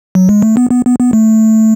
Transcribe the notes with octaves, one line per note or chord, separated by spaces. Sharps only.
F#3
G#3
A3
B3
B3
B3
B3
A3